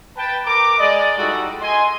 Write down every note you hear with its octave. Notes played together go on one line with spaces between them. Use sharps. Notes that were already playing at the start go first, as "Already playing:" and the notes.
B4 G5 A5
A#4 B4 A#5 D6
G#3 D5 D#5
G3 G#3 D#4 E4 F#4 A4
D#5 G#5 C6